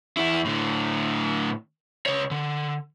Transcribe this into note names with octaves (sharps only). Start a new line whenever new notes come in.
E2 E4
A2 D3
C#2 C#5
D3